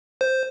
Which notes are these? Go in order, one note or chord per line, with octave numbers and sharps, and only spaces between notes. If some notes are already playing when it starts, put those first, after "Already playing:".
C5